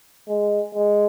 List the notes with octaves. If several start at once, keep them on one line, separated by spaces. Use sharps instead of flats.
G#3
G#3